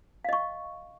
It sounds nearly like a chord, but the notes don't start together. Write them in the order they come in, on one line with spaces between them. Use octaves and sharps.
F5 D#5 C#6